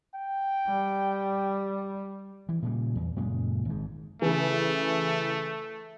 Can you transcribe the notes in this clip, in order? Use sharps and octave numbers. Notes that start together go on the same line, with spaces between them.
G5
G3
E3
A#2 C#3 G3
E2
F#2 A#2 C#3 G#3
G#1 G#2
C#3 E3 A3